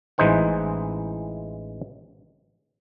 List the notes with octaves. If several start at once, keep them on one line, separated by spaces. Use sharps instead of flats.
A1 E3 G#3 D#4 C5 F#5